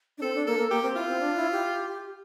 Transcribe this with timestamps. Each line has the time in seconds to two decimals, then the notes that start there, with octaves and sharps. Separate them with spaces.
0.18 D4
0.22 C4 A4
0.35 D4
0.47 A#3 A4
0.59 A#3
0.71 A#3 G4
0.83 C4
0.96 E4 F4
1.08 C4
1.20 D4
1.36 E4
1.52 G4